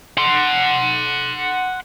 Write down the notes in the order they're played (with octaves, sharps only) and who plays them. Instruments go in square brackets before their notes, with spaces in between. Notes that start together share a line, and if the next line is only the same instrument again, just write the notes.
[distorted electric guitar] F#5 C6